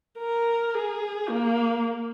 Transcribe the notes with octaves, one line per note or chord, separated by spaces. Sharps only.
A#4
G#4
A#3